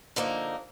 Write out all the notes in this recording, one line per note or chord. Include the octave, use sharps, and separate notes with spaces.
D3 F3 A#3 D#4